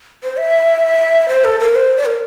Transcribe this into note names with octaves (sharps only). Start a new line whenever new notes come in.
C5
E5
C5
A4
A#4
C5
D5
A#4